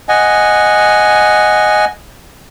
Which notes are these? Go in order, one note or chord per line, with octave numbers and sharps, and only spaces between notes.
D#5 F#5 G#5